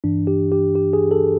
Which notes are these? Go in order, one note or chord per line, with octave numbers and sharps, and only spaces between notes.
G2 E3 D4
G4
G4
G4
G#4
A4